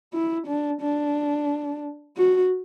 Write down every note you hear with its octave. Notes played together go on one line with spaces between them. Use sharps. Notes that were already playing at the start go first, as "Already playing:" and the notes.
E4
D4
D4
F#4